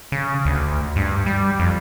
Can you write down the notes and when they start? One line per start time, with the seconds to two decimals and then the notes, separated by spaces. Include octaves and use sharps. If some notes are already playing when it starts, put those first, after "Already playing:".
0.12 C#3
0.45 D2
0.96 G2
1.26 G3
1.59 F2